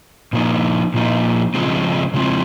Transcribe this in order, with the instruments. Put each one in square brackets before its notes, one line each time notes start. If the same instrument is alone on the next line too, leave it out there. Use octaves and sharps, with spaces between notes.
[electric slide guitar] A#2 F3 A#3 D#4
A#2 F3 A#3 D#4
C#3 F3 G#3 C4
C#3 F3 G#3 C4